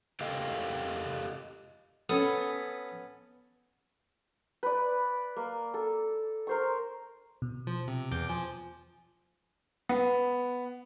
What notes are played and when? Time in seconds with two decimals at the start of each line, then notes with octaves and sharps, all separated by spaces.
0.21 G4 A4 D#5 F5 G5
2.09 B3 C#4 A4 D#6
4.63 B4 D5
5.37 A#3
5.74 A4
6.47 A#4 C5 C#6
7.42 B2
7.67 F3
7.87 C3
8.11 E2 D6 G6
8.29 F3 G#5
9.89 B3